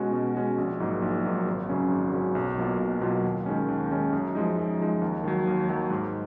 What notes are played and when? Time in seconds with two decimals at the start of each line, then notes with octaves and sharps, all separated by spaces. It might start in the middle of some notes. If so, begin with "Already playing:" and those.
Already playing: B2 G#3 C#4 F#4
0.13 B2
0.35 G#3 C#4 F#4
0.58 A#1
0.80 G#2 F#3 A#3 D#4
1.02 A#1
1.24 G#2 F#3 A#3 D#4
1.46 G#1
1.69 F#2 C#3 F#3 C#4
1.90 G#1
2.13 F#2 C#3 F#3 C#4
2.35 B1
2.58 B2 F#3 A#3 F4
2.80 B1
3.01 B2 F#3 A#3 F4
3.24 D#2
3.46 D#3 G#3 C#4
3.68 D#2
3.91 D#3 G#3 C#4
4.13 F#2
4.35 F3 G#3 D#4
4.58 F#2
4.80 F3 G#3 D#4
5.02 D#2
5.24 D#3 F#3
5.47 D#2
5.69 D#3 F#3
5.90 G#2